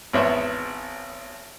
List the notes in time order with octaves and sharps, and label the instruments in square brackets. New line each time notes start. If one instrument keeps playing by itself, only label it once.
[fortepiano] G#1 E2 B3 C5 C#5 E5